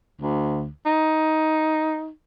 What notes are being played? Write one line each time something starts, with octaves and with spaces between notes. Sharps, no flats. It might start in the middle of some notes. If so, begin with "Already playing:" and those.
D2
D#4